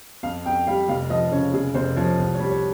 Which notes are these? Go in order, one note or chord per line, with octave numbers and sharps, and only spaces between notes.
F2 F5
F2 G5
G3 F5
F1 F5
F3 D#5
C#3 C#5
F1 G#4
F1 C5
F3 C#5
C2
C#5
G3
C#5